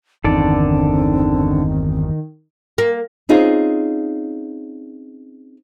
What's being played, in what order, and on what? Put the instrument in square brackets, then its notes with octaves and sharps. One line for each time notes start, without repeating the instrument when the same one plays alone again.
[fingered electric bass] G1 E2 [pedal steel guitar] D3 A4 D5 [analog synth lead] D#3 [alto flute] C4
[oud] A#3
[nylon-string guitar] C4 C#4 D#4 F4 G#4